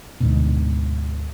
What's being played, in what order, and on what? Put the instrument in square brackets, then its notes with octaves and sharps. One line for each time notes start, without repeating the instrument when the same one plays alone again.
[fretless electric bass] D2 G#2 B2